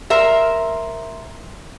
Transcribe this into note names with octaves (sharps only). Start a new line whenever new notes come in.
A#4 C5 E5